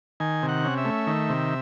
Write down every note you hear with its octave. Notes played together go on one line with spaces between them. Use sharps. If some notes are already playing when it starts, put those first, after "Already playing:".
D#3 G#5
C3
F#5
C#4
E5
A3
D#3
C3